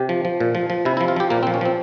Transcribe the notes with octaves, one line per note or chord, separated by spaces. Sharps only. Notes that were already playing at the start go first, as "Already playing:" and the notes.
Already playing: C3 G4
F3
F3
A#2
F3
F3
C3 E4
E4
F3
F4
F3 G4
A#2 A#3
C4
F3
C#4
F3 C4